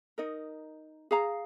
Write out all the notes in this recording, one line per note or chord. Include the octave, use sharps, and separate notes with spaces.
D#4 A#4 D#5
G#4 F5 A#5